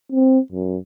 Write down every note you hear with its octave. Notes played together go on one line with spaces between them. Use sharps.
C4
F#2